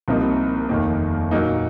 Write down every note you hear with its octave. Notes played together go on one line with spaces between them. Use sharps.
C2 C3 F3 A#3 D#4
F1 D#2 D#3 A#3
A#2 F#3 A#3 D#4